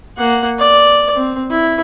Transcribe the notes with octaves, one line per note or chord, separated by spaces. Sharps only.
A#3 F#5
D5
C4
E4